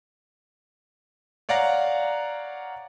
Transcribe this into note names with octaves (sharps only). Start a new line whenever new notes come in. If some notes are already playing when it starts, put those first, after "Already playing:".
C#5 D5 F5 F#5 A#5 A#6